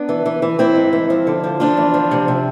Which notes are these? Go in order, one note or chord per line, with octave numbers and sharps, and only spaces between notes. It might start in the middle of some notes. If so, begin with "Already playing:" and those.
Already playing: B3 D4
E3
E3
E3
E3 C4 E4
G#2
E3
F3
D3
F3
F3 D4 F4
E2
F3
C3
C3